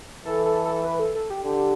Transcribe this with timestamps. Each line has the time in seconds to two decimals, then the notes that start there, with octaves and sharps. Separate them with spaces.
0.25 E3 A4
0.45 A4
0.65 A4
0.84 B4
0.99 A4
1.15 A4
1.30 G4
1.44 D3 G4